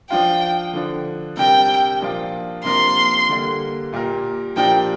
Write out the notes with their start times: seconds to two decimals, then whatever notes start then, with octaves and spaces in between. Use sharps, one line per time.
0.10 F3 D4 F4 G5
0.73 D3 F3 D4
1.37 C3 G3 D4 A#4 G5
2.01 A#2 F3 D4 F4
2.64 C3 F3 A#3 D4 A#4 C6
3.29 D3 G3 A#3
3.93 A#2 A#3 G4 A#4
4.56 A#2 F3 D4 G4 A#4 G5